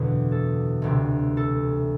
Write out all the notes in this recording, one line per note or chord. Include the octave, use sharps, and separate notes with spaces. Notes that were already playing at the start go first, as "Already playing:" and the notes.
Already playing: F#1 E2 B2 D3 F#3
A4
E1 D2 C3
A4